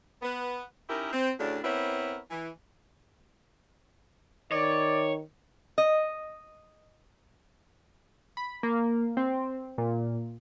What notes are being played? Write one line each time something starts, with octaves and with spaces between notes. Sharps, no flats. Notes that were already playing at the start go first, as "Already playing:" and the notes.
B3 B4
C#4 D#4 E4 G4 A#4
C4
D2 A2 C#3 C#4 D4
B3 C4 E4 A#4 B4 C#5
E3
D#3 C#5 D5
D#5
B5
A#3
C4
A#2